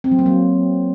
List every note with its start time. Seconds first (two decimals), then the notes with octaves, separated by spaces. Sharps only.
0.04 C4
0.11 F#3
0.19 A#3
0.26 F#3